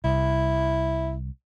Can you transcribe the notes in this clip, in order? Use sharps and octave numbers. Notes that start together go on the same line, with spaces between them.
C2 E4